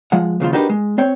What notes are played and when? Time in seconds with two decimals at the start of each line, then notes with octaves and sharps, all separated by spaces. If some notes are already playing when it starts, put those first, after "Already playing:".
0.12 F3 G#3 F#5
0.40 D#2 C#3 F3 F4
0.53 D4 D#4 F#4 G4 A#4 B4
0.69 G#3
0.98 C4 C#5 G5